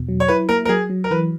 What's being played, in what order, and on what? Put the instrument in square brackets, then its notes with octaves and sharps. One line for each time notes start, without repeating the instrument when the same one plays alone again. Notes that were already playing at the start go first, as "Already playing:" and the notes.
Already playing: [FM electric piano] E2 B2
F#3
[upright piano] C#5
[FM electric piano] E4 [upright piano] B4
[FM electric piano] A#3 [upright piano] A#4
[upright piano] A#4
[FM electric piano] F#3 [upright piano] G#4
[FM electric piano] F#3
[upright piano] A#4
[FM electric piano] E3 [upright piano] B4